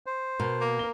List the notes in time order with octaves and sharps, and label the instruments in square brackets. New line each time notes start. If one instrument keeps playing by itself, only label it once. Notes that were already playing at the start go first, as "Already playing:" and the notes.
[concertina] C5
[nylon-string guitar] B2 [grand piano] A#4
[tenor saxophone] A#3
[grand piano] A#4 G7